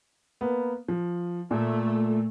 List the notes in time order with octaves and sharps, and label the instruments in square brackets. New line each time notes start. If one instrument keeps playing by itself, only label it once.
[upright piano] A#3 B3
F3
[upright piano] A#2 [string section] A3